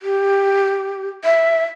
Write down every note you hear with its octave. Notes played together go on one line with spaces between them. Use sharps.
G4
E5